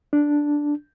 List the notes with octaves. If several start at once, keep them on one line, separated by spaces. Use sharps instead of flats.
D4